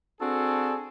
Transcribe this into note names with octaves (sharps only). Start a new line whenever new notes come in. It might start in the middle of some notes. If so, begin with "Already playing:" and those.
C4 D4 F#4 G#4 A4